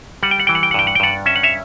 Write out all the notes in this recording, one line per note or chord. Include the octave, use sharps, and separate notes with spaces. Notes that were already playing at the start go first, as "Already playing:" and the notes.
G3 F#5
G5
F#5
E3 G5
F#5
G5
F#5
G2 G5
F#5
G5
G2 D5 F#5
C#4 E5
F#5
C#5 E5